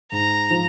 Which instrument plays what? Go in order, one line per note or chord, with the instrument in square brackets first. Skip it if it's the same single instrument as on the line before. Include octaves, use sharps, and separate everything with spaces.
[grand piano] G#2 [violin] A#5
[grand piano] F3